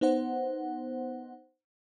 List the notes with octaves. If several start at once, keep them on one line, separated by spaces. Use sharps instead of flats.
B3 D#4 C5 F#5